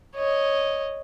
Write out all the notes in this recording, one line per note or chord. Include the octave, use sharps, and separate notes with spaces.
C#5 D#5